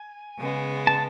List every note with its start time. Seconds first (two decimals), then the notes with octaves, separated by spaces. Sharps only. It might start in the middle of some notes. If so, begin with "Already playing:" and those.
Already playing: G#5
0.39 C#3 G#3 B3
0.87 A5